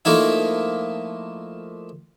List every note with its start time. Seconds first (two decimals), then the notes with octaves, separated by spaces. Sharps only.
0.05 F3 A3 A#3 D#4 E4